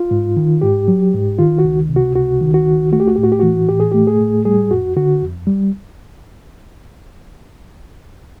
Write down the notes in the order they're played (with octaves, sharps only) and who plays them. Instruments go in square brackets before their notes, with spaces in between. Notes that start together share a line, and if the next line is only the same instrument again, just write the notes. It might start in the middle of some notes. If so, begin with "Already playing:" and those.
Already playing: [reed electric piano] F4
G#2
D#3
G#2 G4
F#3
G#2
D#3 F4
F#4
C#2
C3
F#4
C#2 F#4
D#3
F#4
C#2
A3 F#4
G4
F#4
A2 G4
F#4
G4
E3 F#4
A2 G4
G#4
A3 G4
G#4
A2
G3 G#4
F2 F#4
D3 F#4
F2
G3